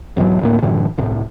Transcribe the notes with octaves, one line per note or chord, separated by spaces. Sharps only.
E1 B1 G#2 F#3
D2 A2 A#3
F#2 A2 D3 E3
G1 C2 A2